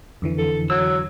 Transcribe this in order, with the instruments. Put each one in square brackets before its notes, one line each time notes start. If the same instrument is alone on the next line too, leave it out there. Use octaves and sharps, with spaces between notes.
[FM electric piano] F2 D3 E3
[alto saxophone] A4
[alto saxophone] F#3 [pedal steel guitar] E6